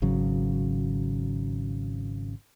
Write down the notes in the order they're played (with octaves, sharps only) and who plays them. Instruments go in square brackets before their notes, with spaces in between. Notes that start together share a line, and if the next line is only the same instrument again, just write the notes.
[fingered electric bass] G#1 C#3 F#3